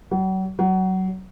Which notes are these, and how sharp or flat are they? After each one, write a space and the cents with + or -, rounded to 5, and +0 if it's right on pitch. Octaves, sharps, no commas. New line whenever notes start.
F#3 +40
F#3 +25